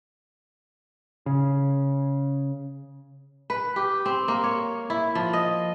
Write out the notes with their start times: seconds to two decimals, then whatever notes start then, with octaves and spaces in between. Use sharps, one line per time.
1.26 C#3
3.50 B4
3.76 G4
4.06 C4
4.28 A#3
4.44 C#5
4.90 E4
5.15 F3
5.33 D#5